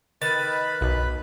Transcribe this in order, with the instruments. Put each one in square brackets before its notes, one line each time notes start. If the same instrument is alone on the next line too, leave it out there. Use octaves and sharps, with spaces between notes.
[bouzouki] D#3 [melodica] B4 B5 [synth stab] A6
[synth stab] B1